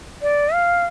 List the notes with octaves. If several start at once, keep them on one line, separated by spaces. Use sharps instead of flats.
D5
F5